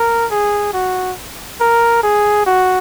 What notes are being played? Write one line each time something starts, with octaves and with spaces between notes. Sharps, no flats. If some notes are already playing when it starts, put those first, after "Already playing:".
Already playing: A#4
G#4
F#4
A#4
G#4
F#4